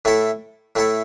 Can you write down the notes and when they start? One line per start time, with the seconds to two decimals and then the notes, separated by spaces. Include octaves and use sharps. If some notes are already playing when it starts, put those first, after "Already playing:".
0.05 A2 A3 E4 A4
0.76 A2 A3 E4 A4